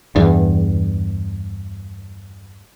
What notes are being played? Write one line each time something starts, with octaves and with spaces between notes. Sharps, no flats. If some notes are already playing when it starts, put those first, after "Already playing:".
E2 G2